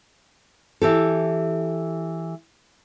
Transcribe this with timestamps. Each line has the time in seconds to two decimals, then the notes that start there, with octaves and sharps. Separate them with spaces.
0.82 E3 G4 A4